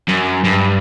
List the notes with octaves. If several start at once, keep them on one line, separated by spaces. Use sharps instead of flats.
F#2
G2